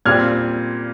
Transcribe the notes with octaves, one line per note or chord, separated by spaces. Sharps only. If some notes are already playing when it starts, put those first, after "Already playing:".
A#2 G3 C4 F4 F6 G#6